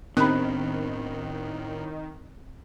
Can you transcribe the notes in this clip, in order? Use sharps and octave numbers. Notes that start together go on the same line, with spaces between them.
A2 D#3 B3 C4 D4 B5 F#6